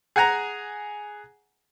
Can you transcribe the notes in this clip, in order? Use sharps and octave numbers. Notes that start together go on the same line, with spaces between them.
G#4 F#5 G#5 A#5